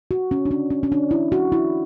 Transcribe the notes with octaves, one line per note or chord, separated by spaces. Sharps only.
F#4
C#4
D4
C#4
C#4
C#4
D4
E4
F#4
E4